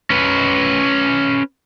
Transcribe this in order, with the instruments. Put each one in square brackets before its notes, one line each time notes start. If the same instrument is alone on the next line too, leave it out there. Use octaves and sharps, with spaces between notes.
[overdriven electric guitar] C#4 B4